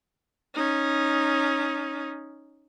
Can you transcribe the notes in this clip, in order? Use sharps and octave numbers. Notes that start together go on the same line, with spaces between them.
C#4 D#4